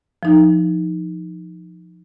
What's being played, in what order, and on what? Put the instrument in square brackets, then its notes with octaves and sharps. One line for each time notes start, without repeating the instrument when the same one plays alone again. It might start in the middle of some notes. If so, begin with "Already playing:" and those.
[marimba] F3 D#4